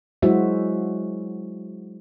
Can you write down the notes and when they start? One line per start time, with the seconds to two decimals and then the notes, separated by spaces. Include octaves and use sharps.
0.22 F#3 G#3 E4 F#4 C5 E5